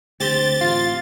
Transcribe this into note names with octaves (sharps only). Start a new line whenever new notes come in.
D2 C4 G4 A6
A1 F4